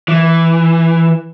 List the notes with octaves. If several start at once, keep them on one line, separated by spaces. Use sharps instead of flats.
E3